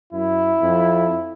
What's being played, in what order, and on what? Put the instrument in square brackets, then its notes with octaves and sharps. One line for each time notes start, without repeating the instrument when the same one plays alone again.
[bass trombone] F#2 [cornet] E4
[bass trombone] F2